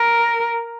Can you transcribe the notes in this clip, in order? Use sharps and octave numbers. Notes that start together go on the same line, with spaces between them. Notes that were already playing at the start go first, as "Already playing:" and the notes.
Already playing: A#4